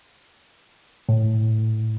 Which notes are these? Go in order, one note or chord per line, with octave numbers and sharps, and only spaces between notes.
A2